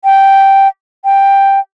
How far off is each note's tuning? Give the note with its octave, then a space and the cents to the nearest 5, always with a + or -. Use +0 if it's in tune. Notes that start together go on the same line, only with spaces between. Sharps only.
G5 -5
G5 +5